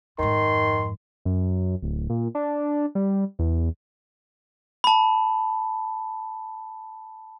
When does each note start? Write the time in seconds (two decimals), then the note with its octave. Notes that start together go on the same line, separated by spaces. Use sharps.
0.19 F2 G#2 D#3 C6
1.25 F#2
1.83 D1
2.10 A#2
2.35 D4
2.95 G3
3.39 E2
4.84 A5 B5